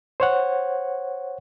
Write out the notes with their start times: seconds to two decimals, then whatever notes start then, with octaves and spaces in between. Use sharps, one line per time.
0.20 C5 C#5 F#5